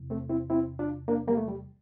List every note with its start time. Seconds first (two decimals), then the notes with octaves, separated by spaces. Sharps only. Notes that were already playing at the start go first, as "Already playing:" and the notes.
Already playing: E2 C3 E3
0.10 A3 C4
0.29 C4 E4
0.50 C4 E4
0.79 D4 F4
1.08 A#3 D4
1.27 G3 A#3
1.37 A3
1.48 G3